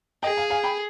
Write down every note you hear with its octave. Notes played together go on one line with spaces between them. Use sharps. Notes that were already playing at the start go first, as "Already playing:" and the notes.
G#4 D#5 G5
F5 G#5
F5 G#5
G5 B5